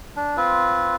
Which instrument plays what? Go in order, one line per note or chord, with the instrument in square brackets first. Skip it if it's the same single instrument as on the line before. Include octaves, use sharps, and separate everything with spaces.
[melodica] D4
C4 F4 B4